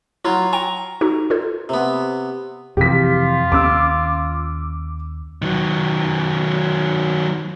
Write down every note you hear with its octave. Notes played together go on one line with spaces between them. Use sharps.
F#3 E4 F4
G5 A#5 C#6
D#4 F#4 A4
F4 A4 C5
C3 B3
F2 C3 E3 F4 G4 B6
D#2 C#4 D6 E6
D#3 F#3